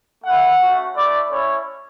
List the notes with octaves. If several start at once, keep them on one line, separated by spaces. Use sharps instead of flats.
A3 E4 F#5
A3 C#4 F#4
A3 E4 D5
A3 C#4 E4 C#5